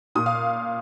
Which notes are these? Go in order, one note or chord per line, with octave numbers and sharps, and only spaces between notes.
A#2 D#6
F5